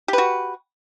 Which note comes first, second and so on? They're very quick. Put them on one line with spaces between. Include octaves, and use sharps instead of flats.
G4 B4 F#4